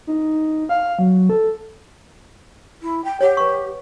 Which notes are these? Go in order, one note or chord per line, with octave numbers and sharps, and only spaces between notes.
D#4
F5
F#3
A4
E4
G5
G4 C#5 F#5
B4 C#6